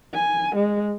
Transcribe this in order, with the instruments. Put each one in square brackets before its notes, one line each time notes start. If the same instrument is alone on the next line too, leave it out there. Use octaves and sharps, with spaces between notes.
[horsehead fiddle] G#5
G#3